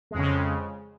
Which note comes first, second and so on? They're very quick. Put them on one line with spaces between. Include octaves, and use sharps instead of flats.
G#3 F2 C#3